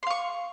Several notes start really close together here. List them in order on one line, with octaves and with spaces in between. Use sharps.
C6 F5 C#6